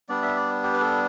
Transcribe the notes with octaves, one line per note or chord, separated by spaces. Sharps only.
G3 B3 D4 D5
E5
D5
G4
B4
A4